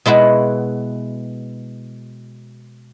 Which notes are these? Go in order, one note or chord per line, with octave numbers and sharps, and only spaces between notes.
B2 G#3 E4 F#4